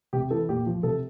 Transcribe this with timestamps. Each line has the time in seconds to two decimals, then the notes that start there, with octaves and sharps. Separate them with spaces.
0.13 C3 G4
0.30 E3 A4
0.49 A#2 G4
0.66 F3
0.83 C3 A4